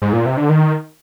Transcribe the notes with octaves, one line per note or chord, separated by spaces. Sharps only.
G#2
A#2
C3
D3
D#3